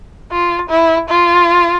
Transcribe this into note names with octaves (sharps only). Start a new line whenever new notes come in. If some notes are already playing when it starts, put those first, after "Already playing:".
F4
E4
F4